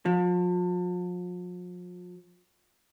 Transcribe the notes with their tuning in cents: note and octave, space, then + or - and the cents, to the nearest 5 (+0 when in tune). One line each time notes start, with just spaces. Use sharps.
F3 +40